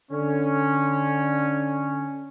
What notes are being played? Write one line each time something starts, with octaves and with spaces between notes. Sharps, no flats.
D3 C#4